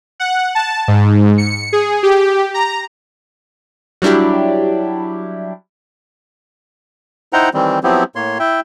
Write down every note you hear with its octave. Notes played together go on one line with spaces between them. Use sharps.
F#5
A5
G#2
C#7
G#4
G4
A#5
F#3 G3 D4 E4 G4
D#4 E4 C5 F#5 G5 A#5
D#3 E3 G3 C4
F3 F#3 B3 C4 E4 G4
A2 A#3 C#5 C6
E4 E5 G5